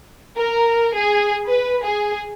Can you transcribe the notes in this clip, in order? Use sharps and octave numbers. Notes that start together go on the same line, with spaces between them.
A#4
G#4
B4
G#4